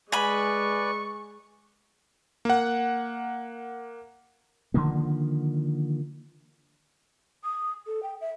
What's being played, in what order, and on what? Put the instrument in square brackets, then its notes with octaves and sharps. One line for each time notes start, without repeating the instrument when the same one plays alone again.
[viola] G#3 [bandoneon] B4 D5 [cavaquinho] G#5 B5 [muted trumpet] C#6
[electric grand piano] A#3 F#5
[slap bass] D3 D#3 F3 A#3
[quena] D#6
A4
G5
E5